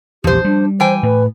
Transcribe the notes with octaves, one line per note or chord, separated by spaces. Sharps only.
A#1 E2 F3 G4 C5
G3 D4
E3 C5 G5 G#5
A2 B4